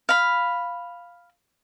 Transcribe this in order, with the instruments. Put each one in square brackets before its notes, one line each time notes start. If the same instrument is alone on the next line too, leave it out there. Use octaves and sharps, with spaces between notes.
[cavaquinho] F5 B5